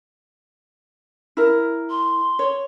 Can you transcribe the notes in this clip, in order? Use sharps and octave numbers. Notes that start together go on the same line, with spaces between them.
E4 A#4
C6
C#5